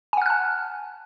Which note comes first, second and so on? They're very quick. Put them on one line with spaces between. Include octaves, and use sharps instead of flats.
G#5 F#5 F6 F#6 A5